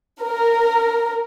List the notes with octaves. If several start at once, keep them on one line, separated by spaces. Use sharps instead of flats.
A#4